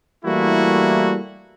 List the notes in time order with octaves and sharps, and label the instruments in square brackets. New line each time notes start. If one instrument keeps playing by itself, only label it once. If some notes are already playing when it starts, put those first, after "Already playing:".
[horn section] E3 G3 A3 A#3 E4 F#4